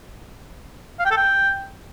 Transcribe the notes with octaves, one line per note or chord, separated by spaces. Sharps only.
F5
G5
A4
G5